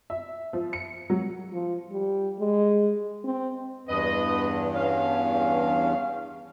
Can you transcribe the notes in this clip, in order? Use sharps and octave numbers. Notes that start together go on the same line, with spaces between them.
E5
F3
C#7
F#3
F3
G3
G#3
C4
E2 G2 B4 D#5
C#4 F5